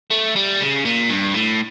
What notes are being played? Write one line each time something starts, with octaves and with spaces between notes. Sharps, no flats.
A3
G3
C#3
A#2
G2
A2